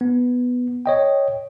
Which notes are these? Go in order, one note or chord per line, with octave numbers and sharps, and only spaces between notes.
B3
C#5 D#5 G5